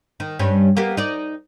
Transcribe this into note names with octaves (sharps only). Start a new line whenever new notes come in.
D#3
G2 G3 C#4
A#3 B3 G4
D#4 D5